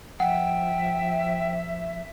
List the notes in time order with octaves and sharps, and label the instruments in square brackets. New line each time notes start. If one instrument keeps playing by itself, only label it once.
[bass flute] F3 [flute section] E5 [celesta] F#5 [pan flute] G5